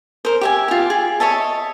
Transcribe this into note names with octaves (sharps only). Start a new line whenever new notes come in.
A#4 C5
G4 E5 G#5
F4 G4
G#4
C#5 D#5 E5 A5